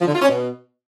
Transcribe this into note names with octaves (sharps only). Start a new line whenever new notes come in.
F3
D3
F4
C#4
B2